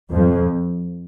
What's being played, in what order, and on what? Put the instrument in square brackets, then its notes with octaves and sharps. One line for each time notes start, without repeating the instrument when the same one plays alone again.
[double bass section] F2 F3